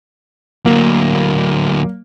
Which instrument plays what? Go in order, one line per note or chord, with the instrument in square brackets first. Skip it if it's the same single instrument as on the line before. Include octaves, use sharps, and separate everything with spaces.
[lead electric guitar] D2 F#3 [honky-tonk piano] A#3